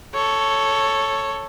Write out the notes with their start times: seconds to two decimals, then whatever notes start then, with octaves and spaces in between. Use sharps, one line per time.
0.14 A4 C#5